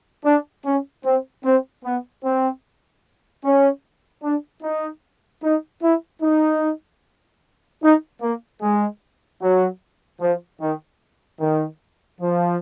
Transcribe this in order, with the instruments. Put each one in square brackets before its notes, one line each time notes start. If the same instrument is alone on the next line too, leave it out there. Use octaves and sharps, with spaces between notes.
[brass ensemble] D4
C#4
C4
C4
B3
C4
C#4
D4
D#4
D#4
E4
D#4
D#4
A#3
G#3
F#3
F3
D#3
D#3
F3